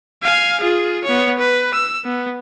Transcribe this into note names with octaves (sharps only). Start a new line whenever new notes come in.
F5 G#5
F4 G#4
B3 C#5
B4
E6
B3